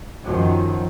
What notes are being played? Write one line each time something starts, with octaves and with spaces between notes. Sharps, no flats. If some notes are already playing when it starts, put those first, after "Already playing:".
F#2 D#3 F3 F#3